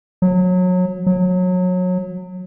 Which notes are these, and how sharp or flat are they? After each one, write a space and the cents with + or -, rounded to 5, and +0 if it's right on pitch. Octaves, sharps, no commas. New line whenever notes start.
F#3 -25
F#3 -25